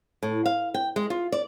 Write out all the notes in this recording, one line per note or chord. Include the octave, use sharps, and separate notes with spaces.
A2
F5
G5
G#3
F4
D5